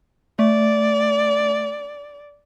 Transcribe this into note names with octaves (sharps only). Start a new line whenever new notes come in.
A3 D5